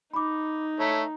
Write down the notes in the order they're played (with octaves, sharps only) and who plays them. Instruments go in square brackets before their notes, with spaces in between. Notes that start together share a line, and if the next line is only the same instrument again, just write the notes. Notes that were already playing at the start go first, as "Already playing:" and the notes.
[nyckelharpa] D#4 [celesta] B5 D6
[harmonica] A3 C#5 [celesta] A#5